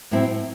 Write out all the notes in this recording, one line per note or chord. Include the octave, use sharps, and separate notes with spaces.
A2 F#3 C4 E4